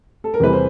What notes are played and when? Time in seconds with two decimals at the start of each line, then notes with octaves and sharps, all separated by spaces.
0.24 A4
0.34 A#4
0.40 E2 C3 E3 G3 B4
0.53 C5